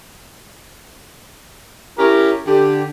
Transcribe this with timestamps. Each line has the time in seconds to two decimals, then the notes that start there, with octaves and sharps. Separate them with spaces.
1.97 C#4 E4 G4 A#4
2.46 D3 G4